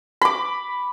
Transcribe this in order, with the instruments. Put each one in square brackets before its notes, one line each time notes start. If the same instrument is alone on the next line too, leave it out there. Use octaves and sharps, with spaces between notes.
[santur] B5 D6